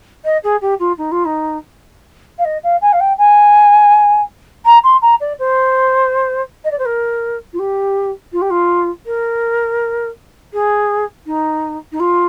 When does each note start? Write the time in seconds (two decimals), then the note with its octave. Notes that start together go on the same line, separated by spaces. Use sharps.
0.24 D#5
0.43 G#4
0.61 G4
0.79 F4
0.98 D#4
1.11 F4
1.25 D#4
2.38 F5
2.44 D#5
2.63 F5
2.81 G#5
2.92 F5
3.00 G5
3.18 G#5
4.65 A#5
4.84 C6
5.02 A#5
5.20 D5
5.39 C5
6.64 D#5
6.71 D5
6.78 C5
6.85 A#4
7.53 F4
7.59 G4
8.32 F4
8.41 G4
8.50 F4
9.06 A#4
10.53 G#4
11.26 D#4
11.92 D#4
11.99 F4